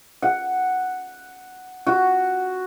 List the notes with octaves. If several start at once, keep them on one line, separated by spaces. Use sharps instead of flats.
F#5
F#4